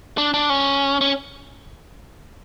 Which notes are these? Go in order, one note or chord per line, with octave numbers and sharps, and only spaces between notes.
D4
D4
C#4
C#4